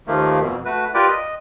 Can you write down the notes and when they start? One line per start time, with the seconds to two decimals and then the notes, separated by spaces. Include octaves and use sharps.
0.07 D#2 D#3 F3 A3 A#3
0.40 F2 B2
0.65 A3 F#4 B4
0.94 F4 G4 A#4 B4 D5 G5
1.08 D#5